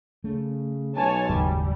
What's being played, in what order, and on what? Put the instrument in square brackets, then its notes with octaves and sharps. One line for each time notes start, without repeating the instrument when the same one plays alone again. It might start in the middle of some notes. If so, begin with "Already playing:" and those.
[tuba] C#3 [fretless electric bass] A3
[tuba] B1 [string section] C#5 G#5 A5
[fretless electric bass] F#1 D#2 G#2 [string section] G3